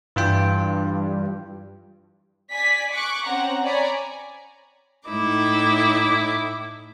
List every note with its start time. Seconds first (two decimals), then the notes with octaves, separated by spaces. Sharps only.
0.16 G2 E3 F4 G5
2.53 D5 G#5 B6
2.91 C#6 D6 F#6
3.25 C4 C#4 F#5 A#5
3.64 C#5 D5 G#5 A#5 B5
5.09 A2 D#4 E4 D6